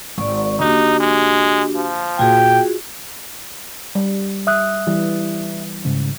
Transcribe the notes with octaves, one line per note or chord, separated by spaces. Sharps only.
G#1 D5 C#6
D3 A#3 D4 D#4 F#4 G4
G#3
F3
A#2 F4 F#4 G#4 G5
G3
E5 D#6 F#6
E3 G3
G#2 C#3